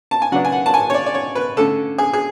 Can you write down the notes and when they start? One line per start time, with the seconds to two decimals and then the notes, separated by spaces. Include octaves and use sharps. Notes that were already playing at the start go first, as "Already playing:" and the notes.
0.11 A5
0.22 G#5
0.32 C#3 F#3 B3 D4 F#5
0.45 G#5
0.52 F#5
0.66 A5
0.74 G#5
0.90 C#5
0.94 D5
1.06 D5
1.14 C#5
1.35 B4
1.57 D3 A3 C#4 A4
1.98 G#4
2.13 G#4